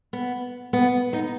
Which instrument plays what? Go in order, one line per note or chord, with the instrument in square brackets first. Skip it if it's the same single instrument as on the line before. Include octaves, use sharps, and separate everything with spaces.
[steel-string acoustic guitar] B3
B3
D#4